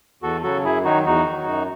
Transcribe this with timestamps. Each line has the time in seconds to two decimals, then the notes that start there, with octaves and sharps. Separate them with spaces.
0.22 E2 F#4 A4
0.43 C#3 F#3 F#4 A4
0.64 F#2 E4 G#4
0.84 D#3 F#3 D#4 F#4
1.05 E2 D#4 F#4
1.25 D#3 F#3
1.46 F#2